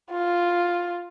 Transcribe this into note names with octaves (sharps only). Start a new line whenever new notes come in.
F4